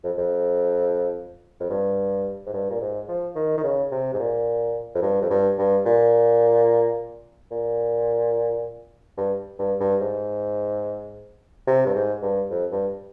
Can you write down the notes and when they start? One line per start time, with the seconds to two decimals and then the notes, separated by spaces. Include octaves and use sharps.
0.04 F2
0.18 F2
1.60 F2
1.70 G2
2.46 G#2
2.53 G2
2.70 A#2
2.81 G#2
3.08 F3
3.35 D#3
3.57 D#3
3.64 C#3
3.92 C3
4.13 G#2
4.19 A#2
4.95 F2
5.02 G2
5.22 F2
5.30 G2
5.58 G2
5.86 A#2
7.51 A#2
9.17 G2
9.59 G2
9.80 G2
10.01 G#2
11.67 C3
11.86 G2
11.95 G#2
12.22 G2
12.51 F2
12.71 G2